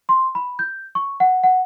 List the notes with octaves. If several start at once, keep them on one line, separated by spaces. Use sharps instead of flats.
C6
B5
G6
C#6
F#5
F#5